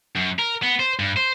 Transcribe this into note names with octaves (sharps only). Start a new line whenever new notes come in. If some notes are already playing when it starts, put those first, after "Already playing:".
F#2
A#4
B3
C5
G2
C5